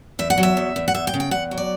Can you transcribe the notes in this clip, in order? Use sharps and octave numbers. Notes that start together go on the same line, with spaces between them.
E2 E5
F#5
F#3
E5
E2
E2
F#5
E2 E5
G5
C#3
G5
E2 F#5
F#3
D5